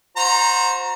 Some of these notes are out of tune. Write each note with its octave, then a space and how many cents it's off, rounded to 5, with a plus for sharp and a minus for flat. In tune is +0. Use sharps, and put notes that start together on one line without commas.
F#4 -35 C5 +0 A#5 +15